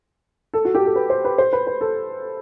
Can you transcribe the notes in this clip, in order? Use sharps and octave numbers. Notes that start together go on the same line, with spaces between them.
A4
F#4
G4
A4
B4
C5
B4
C5
B4
B4
A4